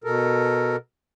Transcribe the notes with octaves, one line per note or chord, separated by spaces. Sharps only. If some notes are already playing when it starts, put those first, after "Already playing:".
B2 A4 A#4